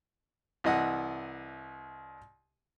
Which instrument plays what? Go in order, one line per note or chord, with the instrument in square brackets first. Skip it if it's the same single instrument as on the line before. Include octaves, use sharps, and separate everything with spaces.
[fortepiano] C2 E3 D#5 F#5